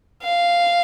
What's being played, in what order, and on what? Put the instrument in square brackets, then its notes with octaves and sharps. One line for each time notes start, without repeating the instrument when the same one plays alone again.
[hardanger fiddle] F5